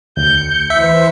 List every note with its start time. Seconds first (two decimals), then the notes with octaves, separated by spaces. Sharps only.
0.17 D2 G6 C#7
0.70 E3 B4 C5 E5 E6